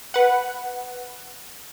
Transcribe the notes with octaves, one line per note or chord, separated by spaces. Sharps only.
B4 F#5